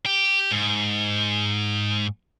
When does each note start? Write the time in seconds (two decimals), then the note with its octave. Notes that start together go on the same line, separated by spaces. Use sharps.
0.06 G4
0.51 G#2